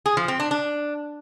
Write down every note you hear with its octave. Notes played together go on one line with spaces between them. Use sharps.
G#4
F3
C4
D4
D4